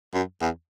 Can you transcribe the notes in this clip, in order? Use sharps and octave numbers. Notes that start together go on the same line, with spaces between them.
F#2
E2